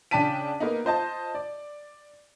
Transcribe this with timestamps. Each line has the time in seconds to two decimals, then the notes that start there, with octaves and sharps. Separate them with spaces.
0.11 C#3 D4 G5 A5 B6 D#7
0.60 A#3 B3 D#4
0.85 F4 C5 D#5 A5
1.35 D5